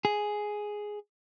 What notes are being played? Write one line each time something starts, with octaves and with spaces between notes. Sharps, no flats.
G#4